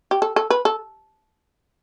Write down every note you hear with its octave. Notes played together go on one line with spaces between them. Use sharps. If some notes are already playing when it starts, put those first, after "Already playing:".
G4
A4
A4
B4
A4